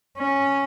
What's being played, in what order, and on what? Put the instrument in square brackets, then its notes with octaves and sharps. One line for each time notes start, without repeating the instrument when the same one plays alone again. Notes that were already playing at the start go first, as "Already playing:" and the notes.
[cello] C#4